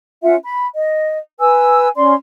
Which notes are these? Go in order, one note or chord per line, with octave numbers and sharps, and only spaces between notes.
C#4 F4 E5 F#5
B5
D#5
B4 G#5 E6
C#4 D5 C6